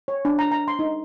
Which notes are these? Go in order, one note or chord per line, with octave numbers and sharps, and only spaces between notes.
C#5
D4
A#5
A#5
C6
D#4